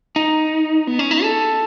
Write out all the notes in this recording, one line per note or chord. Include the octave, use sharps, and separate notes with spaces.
D#4
B3
C#4
D#4
A4